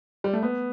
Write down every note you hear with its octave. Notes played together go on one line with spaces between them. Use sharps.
G3
A3
B3